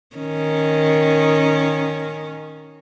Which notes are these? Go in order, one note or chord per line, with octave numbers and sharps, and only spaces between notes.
D#3 C#4